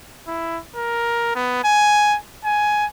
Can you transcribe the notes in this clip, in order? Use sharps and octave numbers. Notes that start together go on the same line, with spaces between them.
E4
A#4
B3
G#5
G#5